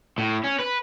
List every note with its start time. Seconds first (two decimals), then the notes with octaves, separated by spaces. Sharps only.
0.18 A2
0.44 C#4
0.59 B4